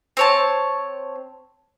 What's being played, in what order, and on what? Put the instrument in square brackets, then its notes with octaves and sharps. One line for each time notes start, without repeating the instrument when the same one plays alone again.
[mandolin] C4 C#5 A5